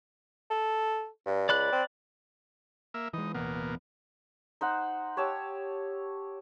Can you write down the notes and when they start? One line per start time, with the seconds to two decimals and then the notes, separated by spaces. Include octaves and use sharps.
0.50 A4
1.26 G2
1.49 C#2 D5 B5 F#6
1.72 C4
2.94 A#3 E5
3.13 E3 G#3 D#4
3.34 D1 B2 E3 A#3 B3
4.61 D#4 C5 F#5
5.17 G4 C#5 A5 E6